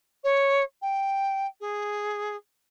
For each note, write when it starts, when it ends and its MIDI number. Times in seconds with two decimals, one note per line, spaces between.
0.24 0.63 73
0.82 1.47 79
1.61 2.36 68